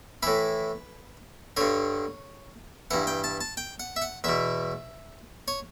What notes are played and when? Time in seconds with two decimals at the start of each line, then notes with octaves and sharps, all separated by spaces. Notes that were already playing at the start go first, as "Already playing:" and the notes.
0.23 A2 E3 B4
1.57 G2 D3 C#5
2.91 G2 E3 F#5
3.07 G5
3.24 A5
3.41 A5
3.57 G5
3.80 F#5
3.96 E5
4.02 F#5
4.24 E2 B2 E5
5.48 C#5